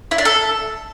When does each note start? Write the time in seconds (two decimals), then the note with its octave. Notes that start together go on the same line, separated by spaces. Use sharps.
0.11 E4
0.18 D4
0.25 A4